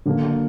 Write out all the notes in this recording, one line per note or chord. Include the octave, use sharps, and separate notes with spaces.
D3 F#3 A#3